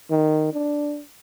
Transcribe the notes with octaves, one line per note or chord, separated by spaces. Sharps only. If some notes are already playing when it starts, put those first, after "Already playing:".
D#3
D4